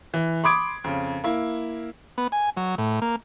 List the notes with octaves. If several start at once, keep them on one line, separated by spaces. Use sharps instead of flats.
E3
B5 C6 D6 D#6 G#6 D7
F2 C#3
A#3 E4
B3
G#5
F#3
A2
A#3